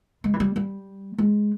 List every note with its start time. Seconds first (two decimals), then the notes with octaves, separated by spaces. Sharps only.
0.24 G#3
0.34 E3
0.40 G3
0.56 G3
1.18 G#3